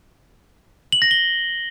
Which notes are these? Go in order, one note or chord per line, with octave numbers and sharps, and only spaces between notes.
F#7
A#6
G7